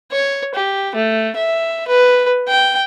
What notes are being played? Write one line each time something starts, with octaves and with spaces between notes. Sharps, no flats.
C#5
G4
A3
E5
B4
G5